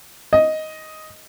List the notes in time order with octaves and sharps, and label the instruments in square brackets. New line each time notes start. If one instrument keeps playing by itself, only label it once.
[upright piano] D#5